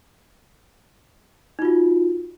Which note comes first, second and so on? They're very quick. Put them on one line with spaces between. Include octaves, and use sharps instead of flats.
D#4 F4 F#4